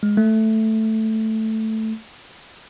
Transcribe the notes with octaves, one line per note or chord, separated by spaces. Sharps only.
G#3
A3